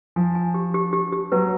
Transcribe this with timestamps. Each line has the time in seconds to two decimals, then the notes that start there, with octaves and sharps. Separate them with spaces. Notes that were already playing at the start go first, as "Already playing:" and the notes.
0.16 F3 G#5
0.35 G#5
0.54 G4
0.74 G4
0.93 G4
1.13 G4
1.32 F#3 B4